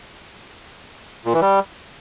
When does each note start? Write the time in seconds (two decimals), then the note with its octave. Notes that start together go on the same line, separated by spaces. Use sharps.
1.26 A#2
1.34 E3
1.42 G3